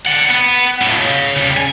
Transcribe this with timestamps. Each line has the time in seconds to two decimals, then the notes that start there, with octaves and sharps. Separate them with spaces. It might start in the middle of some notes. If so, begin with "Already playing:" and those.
0.05 D5 F#5
0.29 B3
0.81 C#2 A2
0.98 C#2 C#3
1.36 C#3 G3
1.56 G#5